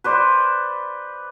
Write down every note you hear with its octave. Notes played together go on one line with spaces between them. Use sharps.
B4 C5 D5